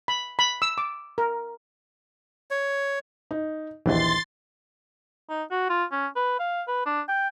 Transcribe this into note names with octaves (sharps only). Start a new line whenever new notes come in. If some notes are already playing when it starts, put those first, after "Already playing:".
B5
B5
E6
D6
A#4
C#5
D#4
A#1 D#2 E3 C6 A6
D#4
F#4
F4
C#4
B4
F5
B4
D4
G5